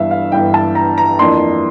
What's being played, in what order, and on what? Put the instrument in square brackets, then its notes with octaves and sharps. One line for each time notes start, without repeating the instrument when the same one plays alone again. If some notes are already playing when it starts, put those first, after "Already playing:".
Already playing: [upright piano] G1 G2 E3 E5 F5
F5
G1 G2 E3 G5
A5
A#5
A#5
F2 E3 A#3 D4 C6